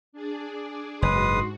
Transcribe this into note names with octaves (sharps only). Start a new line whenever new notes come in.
D4 G#4 D5
F#1 G#2 G#3 F#4 B4 C6 D#6